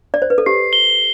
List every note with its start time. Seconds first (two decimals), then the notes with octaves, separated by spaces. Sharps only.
0.14 D5
0.22 C5
0.30 B4
0.38 A4
0.46 G4 C7
0.73 G7